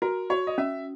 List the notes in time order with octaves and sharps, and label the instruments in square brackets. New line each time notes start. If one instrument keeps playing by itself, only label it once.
[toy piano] F#4 [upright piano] A#4
[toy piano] F#4 [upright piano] C#5
[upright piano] D#5
[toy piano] C#4 [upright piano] E5